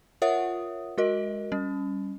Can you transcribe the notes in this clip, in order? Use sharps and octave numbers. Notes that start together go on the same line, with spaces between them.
F4 A#4 C#5 E5 F#5 D#6
G#3 F#4 A#4 D#5
G3 C#4